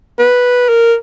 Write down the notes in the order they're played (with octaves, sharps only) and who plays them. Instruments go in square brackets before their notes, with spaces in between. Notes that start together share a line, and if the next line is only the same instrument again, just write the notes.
[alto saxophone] B4
A#4